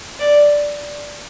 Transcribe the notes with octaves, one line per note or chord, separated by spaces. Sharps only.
D5